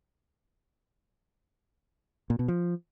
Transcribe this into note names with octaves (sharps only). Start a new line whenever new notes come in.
A#2
B2
F3